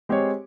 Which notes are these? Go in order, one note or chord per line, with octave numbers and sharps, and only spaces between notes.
G#3 C4 G4 C#5